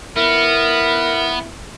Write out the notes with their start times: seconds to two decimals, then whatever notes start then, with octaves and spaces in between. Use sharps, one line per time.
0.17 B3 E4 A#4